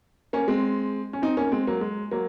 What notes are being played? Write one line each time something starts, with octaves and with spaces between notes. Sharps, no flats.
A#3 C#4
G#3 C4
C#4
C4 D#4
A#3 C#4
G#3 C4
F#3 A#3
G#3
F#3 A#3